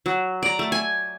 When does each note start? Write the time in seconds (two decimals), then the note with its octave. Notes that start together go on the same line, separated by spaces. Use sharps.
0.06 F#3
0.43 D5 A#5
0.59 A3
0.72 G#5